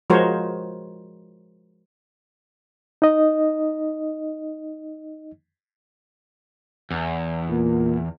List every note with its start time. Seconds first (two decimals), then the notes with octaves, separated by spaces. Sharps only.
0.10 F3 G#3 F#4 A#4 C5 C#5
3.02 D#4 D#5
6.91 E2
7.49 A#2